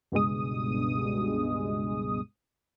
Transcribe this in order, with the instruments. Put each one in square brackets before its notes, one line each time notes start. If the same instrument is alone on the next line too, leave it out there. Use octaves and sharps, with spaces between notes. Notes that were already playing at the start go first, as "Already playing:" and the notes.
[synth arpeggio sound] C#2 G2 B2 G#3 D#6